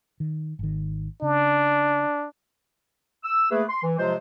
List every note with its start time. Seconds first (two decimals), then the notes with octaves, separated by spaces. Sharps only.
0.20 D#3
0.59 G#1 D#3
1.22 C#3 D4
3.23 E6
3.51 A3 A#3 G#4 B4
3.69 C6
3.83 E3
3.98 C3 F3 F#3 G#3 F4 C5